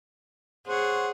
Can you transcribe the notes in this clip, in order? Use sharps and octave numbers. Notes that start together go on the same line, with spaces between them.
G#4 C5 C#5 F#5